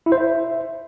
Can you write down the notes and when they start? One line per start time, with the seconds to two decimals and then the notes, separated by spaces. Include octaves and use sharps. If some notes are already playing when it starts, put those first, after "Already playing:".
0.06 E4
0.12 C5
0.18 E5